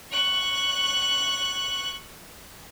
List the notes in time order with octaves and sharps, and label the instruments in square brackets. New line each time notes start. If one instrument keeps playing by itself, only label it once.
[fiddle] C#6 F#6